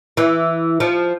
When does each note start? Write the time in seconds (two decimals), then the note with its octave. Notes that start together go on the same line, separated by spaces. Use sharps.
0.17 E3
0.80 F3